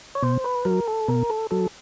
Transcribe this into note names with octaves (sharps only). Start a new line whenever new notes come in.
C#5
B2 C5
B4
F#3 A#4
A4
B2 A#4
A4
F#3 A4